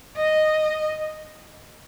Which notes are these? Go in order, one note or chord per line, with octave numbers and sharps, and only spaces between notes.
D#5